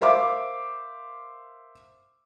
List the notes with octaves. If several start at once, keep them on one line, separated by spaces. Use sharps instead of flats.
A#4 C5 E5 F5 D6